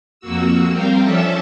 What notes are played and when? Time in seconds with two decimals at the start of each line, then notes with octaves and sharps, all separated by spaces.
0.20 F2 A#3 F#4 E6
0.71 G3 C4 A#4 F5 G5
1.01 F3 C#4 D4 A4 E5 A5